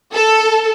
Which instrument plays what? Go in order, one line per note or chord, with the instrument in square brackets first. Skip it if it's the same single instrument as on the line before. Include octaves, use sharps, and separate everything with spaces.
[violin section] A4